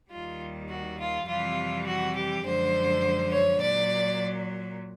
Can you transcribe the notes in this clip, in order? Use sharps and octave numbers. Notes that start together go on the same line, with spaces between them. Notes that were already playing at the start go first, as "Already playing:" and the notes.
D#2 D#3 G3 F4
F#4
F4
F2 C3 E3 G3 F4
F#4
G4
F#2 D3 F3 G#3 C5
C#5
A#2 F#3 D5